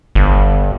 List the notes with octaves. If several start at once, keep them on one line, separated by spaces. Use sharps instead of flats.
G1